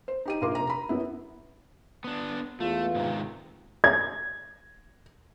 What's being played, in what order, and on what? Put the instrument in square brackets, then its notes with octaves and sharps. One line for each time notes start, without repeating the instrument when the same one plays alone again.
[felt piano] C5
D#4 G4 D#7
A#1 F4 A#4 C6 D6
F1 A#5
A#5 B5
F#2 B3 E4
[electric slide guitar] B3 D4
[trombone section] E2 F4 [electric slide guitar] A3
[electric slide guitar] G#2 C3 D#3
[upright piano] G#6